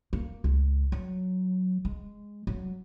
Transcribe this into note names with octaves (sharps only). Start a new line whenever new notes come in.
A#3
C#2
F#3
G#3
F#3